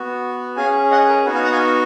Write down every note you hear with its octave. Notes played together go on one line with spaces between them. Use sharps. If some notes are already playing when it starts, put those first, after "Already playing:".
Already playing: B3 F#4
C#4 G#4 F5 G#5
D#5 F#5
A#4
B3 D#4 F#4 B4
F5 G#5
F#5 A#5
F5 G#5